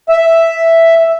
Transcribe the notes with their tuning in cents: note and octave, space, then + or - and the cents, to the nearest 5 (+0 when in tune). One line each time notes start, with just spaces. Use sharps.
E5 +0